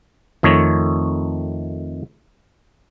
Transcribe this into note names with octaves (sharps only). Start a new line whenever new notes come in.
F2 D#3 A3 C#5